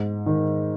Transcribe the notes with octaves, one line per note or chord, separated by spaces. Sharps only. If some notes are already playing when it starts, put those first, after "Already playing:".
Already playing: G#2
D#3